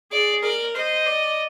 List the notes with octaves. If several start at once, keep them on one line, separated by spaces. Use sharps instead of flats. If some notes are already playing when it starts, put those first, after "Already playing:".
G#4 D5
A#4 D5
C5 D#5
D5